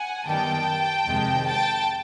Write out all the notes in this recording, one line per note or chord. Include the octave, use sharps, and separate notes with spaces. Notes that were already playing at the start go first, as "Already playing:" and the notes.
Already playing: F#5 G#5
F#2 D#3 G3 B3 G5 A5
F2 C3 D#3 G#3
G5 A5